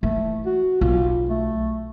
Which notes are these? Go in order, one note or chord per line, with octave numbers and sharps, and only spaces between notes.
E3 A3
F#4
B1 F4
A3